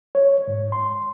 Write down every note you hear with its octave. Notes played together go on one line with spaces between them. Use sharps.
C#5
G#2
C6